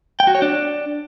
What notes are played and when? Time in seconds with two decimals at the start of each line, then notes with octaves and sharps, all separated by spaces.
0.20 G5
0.27 F#4
0.35 C#5
0.42 D4